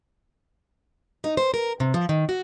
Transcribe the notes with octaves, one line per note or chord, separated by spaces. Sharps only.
D#4
C5
A#4
C3
F3
D#3
F#4